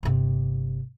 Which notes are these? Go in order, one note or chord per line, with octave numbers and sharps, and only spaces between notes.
G1 C3